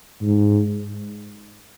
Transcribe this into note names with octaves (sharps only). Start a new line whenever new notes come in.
G#2